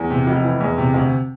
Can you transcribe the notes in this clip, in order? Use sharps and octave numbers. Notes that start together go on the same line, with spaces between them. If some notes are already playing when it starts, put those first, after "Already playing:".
Already playing: E2
C3
F1
E3
E2
C3
D2